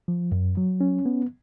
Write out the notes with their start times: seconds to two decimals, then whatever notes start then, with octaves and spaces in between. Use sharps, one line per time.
0.08 F3
0.32 F#2
0.57 F#3
0.81 C#4
1.06 B3